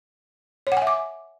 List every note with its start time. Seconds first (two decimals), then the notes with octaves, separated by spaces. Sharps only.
0.67 C#5
0.72 F#5
0.77 G#5
0.82 E5
0.87 D6